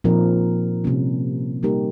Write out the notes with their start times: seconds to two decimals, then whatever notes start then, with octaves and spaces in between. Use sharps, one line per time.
0.04 A#2 F3 C4 D#4 A#4
0.84 C3 G3 A#3 C#4
1.63 G3 A#3 D#4 G4 A#4